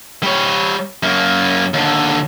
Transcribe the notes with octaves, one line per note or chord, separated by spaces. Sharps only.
G3 C#5
F#2 A#3
D#2 D3